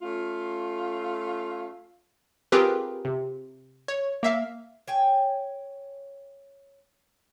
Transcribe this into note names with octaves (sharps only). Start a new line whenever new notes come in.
A3 C#4 F4
C4 F4 G4 G#4 A#4 B4
C3
C#5
A#3 E5 F5
C#5 G5 G#5